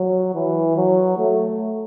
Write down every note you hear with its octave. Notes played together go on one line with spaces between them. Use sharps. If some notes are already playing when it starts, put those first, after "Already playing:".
Already playing: F#3
E3
F#3
A3